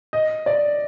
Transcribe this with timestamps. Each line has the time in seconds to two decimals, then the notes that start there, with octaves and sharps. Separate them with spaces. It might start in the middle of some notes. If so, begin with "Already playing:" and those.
0.13 D#5
0.46 D5